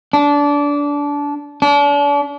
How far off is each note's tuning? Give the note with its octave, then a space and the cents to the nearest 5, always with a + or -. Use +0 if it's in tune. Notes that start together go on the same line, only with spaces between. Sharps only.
D4 -20
D4 -40